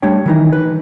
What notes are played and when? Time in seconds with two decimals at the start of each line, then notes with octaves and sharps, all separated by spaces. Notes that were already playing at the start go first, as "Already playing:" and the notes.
0.02 G3 A3 D4 C#5 G5
0.26 D#3 E3 D#4
0.52 B4